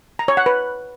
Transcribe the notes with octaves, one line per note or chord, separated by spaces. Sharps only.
A#5
C#5
F#5
B4